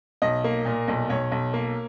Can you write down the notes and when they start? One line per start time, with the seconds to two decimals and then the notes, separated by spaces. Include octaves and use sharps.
0.22 B1 D#5
0.44 A#3
0.65 A#2
0.88 B1
1.10 B1 C#5
1.32 B1
1.54 A#3